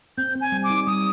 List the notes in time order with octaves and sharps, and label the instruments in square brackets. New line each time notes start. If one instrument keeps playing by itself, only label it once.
[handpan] C4 [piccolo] G6
[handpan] C4
[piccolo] G#5
[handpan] G3
[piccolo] D6
[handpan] D#4
[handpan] G3 [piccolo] D#6